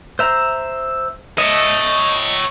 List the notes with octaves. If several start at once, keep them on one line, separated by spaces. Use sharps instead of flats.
C5 E5 A#5
C#5 D#5 E5